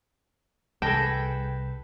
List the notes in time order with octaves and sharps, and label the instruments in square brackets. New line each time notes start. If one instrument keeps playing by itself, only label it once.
[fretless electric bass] C2 [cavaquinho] G#4 A4 B4 [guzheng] G5 [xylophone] A5 A#6